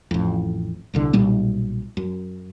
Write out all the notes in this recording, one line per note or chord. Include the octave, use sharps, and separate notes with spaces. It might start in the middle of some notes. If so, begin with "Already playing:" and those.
A1 F2
D#1 C2 D3
B1 A#2 G3 B3
F#2